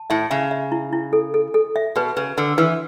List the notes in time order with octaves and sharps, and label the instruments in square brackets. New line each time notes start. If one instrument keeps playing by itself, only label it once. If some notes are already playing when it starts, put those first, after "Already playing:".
Already playing: [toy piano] A5
[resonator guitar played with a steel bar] A2 [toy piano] E5
[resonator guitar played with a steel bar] C#3 [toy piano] E5
[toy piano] E5
E4
E4
A4
A4
A4
E5
[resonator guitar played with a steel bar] B2 [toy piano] B4
[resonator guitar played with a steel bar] C#3 [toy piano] B4
[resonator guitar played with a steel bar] D3 [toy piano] B4
[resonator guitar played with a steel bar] E3 [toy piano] B4